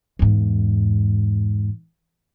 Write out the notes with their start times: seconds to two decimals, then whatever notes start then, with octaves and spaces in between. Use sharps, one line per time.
0.19 E2 G#2